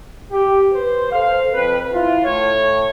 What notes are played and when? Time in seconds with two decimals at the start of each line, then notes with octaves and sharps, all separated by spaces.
0.31 G4
0.73 B4 C5
1.12 A4 C5 F5
1.53 F2 C4 B4
1.92 E4 F4
2.24 A2 C#5